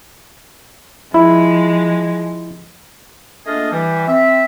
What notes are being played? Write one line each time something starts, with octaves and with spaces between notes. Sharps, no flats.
F3 G#3 E4
A3 A#3 D4 F4 G#4 D#5
E3 G3
C4 E5